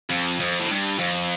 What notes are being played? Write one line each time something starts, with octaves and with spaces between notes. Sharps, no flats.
F2
F2
A2
G2
F2